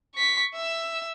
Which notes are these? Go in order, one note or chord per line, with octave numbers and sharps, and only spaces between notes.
C#6 B6
E5 E6